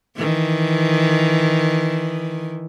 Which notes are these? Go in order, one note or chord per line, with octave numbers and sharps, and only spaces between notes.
D#3 E3